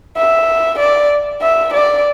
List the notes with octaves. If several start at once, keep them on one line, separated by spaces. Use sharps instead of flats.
E5
D5
E5
D5